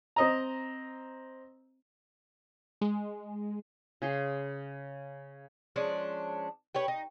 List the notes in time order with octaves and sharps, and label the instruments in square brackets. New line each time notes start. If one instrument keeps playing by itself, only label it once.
[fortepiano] C4 D#5 A#5
[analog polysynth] G#3
[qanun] C#3 G#4 C6
[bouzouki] F3 G#3 C#4 D4
G4 B4 C#5
D#4